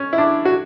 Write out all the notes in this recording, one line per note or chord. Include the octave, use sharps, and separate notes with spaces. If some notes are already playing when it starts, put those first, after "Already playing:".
Already playing: C#4
E4
D4
F#4